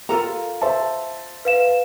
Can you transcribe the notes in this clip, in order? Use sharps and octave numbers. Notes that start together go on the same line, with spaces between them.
F4 A4 A#4 F5 A#5
C5 E5 A5
B4 F5 E7